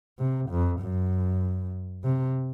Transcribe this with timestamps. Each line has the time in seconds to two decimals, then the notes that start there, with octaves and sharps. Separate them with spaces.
0.19 C3
0.50 F2
0.81 F#2
2.04 C3